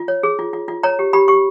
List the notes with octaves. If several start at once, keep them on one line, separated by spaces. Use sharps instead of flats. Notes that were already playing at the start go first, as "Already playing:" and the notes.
Already playing: F4
C#5
G#4
F4
F4
F4
C#5 A#5
G4
G4 B5
G4 C#6